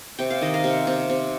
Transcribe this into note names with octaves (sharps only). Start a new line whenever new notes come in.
C3 G5
F5
D#3 D#5
F5
C3
C3
C3